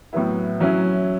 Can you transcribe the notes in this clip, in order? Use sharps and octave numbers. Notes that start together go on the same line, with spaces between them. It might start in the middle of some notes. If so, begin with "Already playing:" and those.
A2 F#3 B3 E4
F#3 C#4 E4